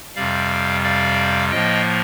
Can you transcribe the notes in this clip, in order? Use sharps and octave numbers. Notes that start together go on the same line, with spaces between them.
F2 C3 G3 D5 F5
D5 F5
A2 F3 A#3 D#5 G5